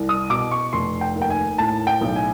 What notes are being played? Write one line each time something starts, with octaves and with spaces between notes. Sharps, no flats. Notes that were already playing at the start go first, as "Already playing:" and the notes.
Already playing: C2
D#6
B2 D6
C#6
F1 C6
G5
D#2
G5
G#5
A2 A5
G5
B1
G#5